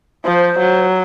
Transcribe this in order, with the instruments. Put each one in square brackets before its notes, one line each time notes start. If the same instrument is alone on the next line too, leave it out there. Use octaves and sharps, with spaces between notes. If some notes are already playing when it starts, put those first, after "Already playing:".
[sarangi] F3 [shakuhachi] C5
[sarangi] F#3